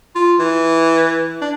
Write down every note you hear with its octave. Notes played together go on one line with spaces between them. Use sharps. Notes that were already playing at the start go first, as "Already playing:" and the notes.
F4
E3
D4